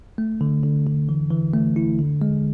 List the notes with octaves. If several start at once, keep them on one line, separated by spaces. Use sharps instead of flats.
A3
D3
D3
D3
E3
E3
A3
E4
D3
G#3